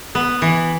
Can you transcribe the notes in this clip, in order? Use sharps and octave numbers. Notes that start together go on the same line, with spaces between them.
B3
E3